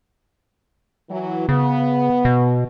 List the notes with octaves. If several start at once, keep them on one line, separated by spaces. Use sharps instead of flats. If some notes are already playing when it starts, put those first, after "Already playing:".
E3 F#3
C#3 B3
B2